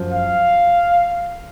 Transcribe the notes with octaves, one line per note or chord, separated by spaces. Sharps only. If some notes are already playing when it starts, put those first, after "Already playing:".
Already playing: F#2 F3
F5